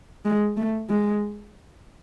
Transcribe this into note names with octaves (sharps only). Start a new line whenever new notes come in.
G#3
A3
G#3